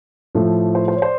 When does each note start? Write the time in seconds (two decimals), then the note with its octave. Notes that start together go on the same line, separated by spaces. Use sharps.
0.35 A2 F3 A3
0.75 C5
0.88 C5
0.96 C#5
1.02 C5 D5